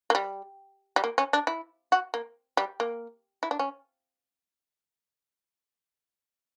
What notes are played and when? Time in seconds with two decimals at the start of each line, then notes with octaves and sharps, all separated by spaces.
0.10 A#3
0.15 G3
0.96 G3
1.04 A#3
1.18 C#4
1.33 D4
1.47 E4
1.92 F#4
2.14 A#3
2.57 G3
2.80 A#3
3.43 E4
3.51 D4
3.59 C#4